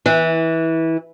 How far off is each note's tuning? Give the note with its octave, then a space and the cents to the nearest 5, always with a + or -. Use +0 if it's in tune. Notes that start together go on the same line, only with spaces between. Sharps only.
E3 -20